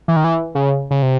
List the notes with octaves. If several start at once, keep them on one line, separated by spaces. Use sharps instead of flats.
E3
D#3
E3
C#3
C#3
C3